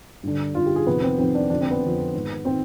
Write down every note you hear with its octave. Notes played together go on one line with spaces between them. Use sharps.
G2 D3
G2 D3 F4
G4
G#4
F2 C3 D#3 B3
C4
F2 C3 D#3 C4
D4
F2 D3 D4
C4
B3
F2 D3
G#2 D#3
D#3 C4